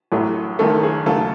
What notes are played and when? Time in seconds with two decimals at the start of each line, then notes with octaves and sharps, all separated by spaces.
0.12 A1 A2 F#3 A3
0.59 F#1 F#2 D#3 A3 A4
0.83 G#4
1.06 D#2 C#3 F#3 A3 A4